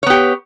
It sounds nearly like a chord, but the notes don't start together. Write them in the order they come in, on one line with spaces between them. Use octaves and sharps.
C#5 B3 G4